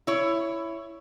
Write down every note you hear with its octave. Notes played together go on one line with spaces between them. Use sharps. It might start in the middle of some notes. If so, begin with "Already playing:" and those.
E4 C#5